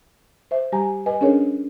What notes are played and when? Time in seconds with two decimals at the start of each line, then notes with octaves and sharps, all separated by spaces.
0.51 C5 E5
0.72 G3 G4 G#5 A#5
1.06 B4 D#5 G#5
1.21 C#4 D4 G#4 A#4 C#5